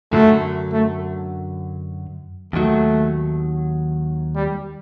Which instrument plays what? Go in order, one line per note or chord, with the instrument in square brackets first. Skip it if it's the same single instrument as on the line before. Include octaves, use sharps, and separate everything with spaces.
[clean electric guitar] F#2 D3 F#3 [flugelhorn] A3
[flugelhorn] A3
[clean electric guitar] D#2 D#3 F#3 [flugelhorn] A3
[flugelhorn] G3